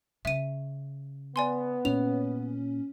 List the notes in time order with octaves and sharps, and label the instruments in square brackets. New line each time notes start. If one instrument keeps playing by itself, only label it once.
[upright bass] C#3 [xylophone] E5 D#7
[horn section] B3 [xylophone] D5 G#5 C6
[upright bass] A#2 [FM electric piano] C#4 [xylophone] F7